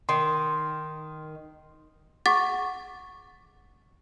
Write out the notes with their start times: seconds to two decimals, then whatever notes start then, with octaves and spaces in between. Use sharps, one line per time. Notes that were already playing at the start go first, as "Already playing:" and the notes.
0.09 D#3 C6
2.26 G#4 F#5 C#6 D6 A6